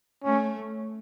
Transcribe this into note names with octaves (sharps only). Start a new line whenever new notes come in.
A3 C#4